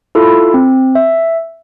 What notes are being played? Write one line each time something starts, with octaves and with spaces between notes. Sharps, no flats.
E4 F4 A4
C4
E5